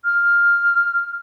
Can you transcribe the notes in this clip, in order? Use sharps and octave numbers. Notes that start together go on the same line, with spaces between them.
F6